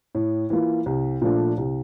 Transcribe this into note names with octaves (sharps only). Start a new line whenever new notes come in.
A2
E3 A#3 F4
C2
A#2 F3 A3 D4
C2